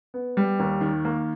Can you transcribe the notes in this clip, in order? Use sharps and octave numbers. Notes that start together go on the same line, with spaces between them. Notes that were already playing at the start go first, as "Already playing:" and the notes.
B3
G3
D#2
D#3
A#3